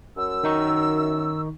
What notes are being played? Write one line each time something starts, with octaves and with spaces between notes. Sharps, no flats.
F#2 E6
D#3 D#4 C#6